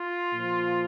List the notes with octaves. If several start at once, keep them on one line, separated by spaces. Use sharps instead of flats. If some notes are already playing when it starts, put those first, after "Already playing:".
Already playing: F4
A#2 F3